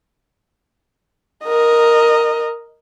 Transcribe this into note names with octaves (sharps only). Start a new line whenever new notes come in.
A#4 D#5